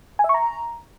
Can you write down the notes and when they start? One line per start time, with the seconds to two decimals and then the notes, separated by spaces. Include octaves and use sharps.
0.19 G#5
0.24 E5
0.29 C#6
0.34 A#5